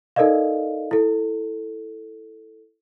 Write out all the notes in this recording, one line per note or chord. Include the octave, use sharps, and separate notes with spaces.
D#4 A4 A#4 D5 D#5 F5
E4 A4